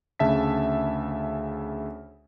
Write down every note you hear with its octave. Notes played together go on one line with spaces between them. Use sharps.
D2 C#3 E5 A5 B6